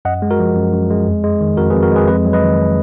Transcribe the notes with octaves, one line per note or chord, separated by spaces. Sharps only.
F#2 D#5 F#5
G#3
F#4 A#4
F3
F#2
F#2
G#3
F2
G#3
D#3
F2 F#4 A#4
G#4 B4
F2
F#4 A#4
G#3 G#4 B4
F2 B4 D#5
F#3
B4 D#5
D#3